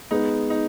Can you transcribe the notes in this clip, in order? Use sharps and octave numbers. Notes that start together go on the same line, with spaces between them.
G#3 B3 D#4
D#4